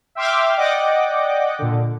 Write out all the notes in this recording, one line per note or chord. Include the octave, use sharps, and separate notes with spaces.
E5 G5 C6 D6 F6
D5 D#5 F#5 G5 D6
A#2 D3